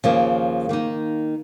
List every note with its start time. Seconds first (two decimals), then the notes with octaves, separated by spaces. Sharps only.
0.04 D#2 C#3 F3 A#3
0.69 D#3 A#3 D#4